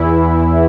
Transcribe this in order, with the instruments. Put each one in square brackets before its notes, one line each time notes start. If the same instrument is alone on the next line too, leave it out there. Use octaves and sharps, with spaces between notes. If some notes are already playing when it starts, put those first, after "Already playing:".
Already playing: [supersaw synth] E2 E3 E4